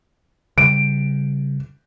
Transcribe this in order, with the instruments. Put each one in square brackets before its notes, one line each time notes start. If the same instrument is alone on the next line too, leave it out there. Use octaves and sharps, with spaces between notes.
[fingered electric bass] C#3 G3 [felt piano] D7